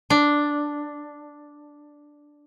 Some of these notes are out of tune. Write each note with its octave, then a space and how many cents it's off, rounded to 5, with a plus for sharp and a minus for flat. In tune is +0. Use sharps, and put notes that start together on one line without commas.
D4 +0